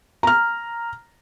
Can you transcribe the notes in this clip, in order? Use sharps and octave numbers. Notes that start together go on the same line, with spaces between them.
A#5 F6